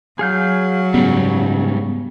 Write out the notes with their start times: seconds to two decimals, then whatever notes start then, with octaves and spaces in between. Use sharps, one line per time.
0.19 F#3 G#4 F5 G6
0.94 G#2 C#3 G3 B3